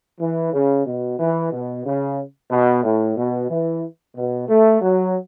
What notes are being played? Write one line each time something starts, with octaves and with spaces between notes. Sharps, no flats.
E3
C#3
B2
E3
B2
C#3
B2
A2
B2
E3
B2
A3
F#3